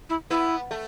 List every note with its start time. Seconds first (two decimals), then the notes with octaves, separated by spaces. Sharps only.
0.09 E4
0.30 B3 E4
0.71 A3